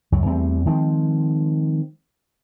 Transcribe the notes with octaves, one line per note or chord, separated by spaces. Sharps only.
C#2 F#2 F#3
E2 G3 A3 C4
D#3 F3 G#3 C4